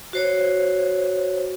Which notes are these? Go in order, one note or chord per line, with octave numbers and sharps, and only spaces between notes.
F#4 C5 C#5